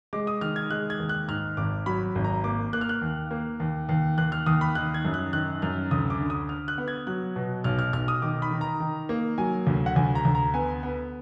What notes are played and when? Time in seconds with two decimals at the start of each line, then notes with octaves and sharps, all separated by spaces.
0.13 G#3 D6
0.27 D#6
0.41 D#3 F6
0.56 G#6
0.70 G#3 F#6
0.90 G#6
0.99 D#2
1.09 F#6
1.28 G#2 F6
1.57 G#1 D6
1.86 F#3 B5
2.15 G#1
2.24 A#5
2.44 A#3 D6
2.73 A#3 F#6
2.81 F6
2.89 F#6
3.02 D#2
3.31 A#3
3.60 D#2
3.89 D#2
4.18 D#2 F#6
4.32 F6
4.46 D#2 D#6
4.61 B5
4.75 D#3 F#6
4.94 G#6
5.05 F#2
5.14 F#6
5.33 D#3 F#6
5.62 F#2 F6
5.91 D2 D#6
6.10 D6
6.20 D3
6.30 D#6
6.49 D3 F6
6.68 F#6
6.78 B3
6.88 G#6
7.07 F#3 F#6
7.36 B2
7.64 B1 F6
7.79 F6
7.93 B1 F6
8.08 D#6
8.22 D#3 D6
8.42 B5
8.51 D#3
8.61 A#5
8.80 D#3
9.09 A#3
9.38 F#3 G#5
9.67 D2
9.86 F#5
9.96 D2 G#5
10.15 A#5
10.25 D2
10.35 A#5
10.54 B3 G#5
10.83 B3